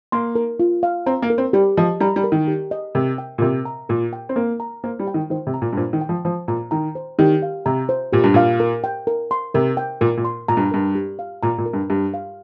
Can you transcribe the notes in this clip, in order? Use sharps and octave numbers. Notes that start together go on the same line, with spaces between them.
A#3 C6
A#4
F4
F5
C4 A#5
A#3
A#4
C4
G3 G4
F3 D#5
G3 A#5
G3
A#4
D#3
G4
D#5
C3 A#4
G5
A#2
C3 A#4
A#5
A#2 A#4
G5
C4
A#3 A#4
A#5
A#3 C5
G3
G5
D#3
D#3 C5
C3
A#5
A#2
G2
A#2 C5
D#3
G5
F3
F3 C5
A#2 A#5
D#3 A#5
C5
D#3 G4
F5
C3 A#5
C5
A#2 G4
G2
A#2 F5
A#4
G5
A#4
C6
C3 A#4
G5
A#2 A#4
A#2
C6
A#2 A#5
G2
G2 A#4
G4
F5
A#2 A#5
A#2
A#4
G2
G2 G4
F5